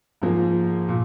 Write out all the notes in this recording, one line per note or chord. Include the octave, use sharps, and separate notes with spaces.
G#2 F3 A#3 F4 G#4
A#2